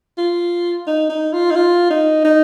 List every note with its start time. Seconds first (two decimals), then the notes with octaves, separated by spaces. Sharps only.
0.18 F4
0.87 D#4
1.10 D#4
1.33 F4
1.51 D#4
1.56 F4
1.90 D#4
2.25 D#4